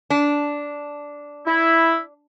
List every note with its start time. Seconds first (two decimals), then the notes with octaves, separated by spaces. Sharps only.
0.10 D4
1.47 E4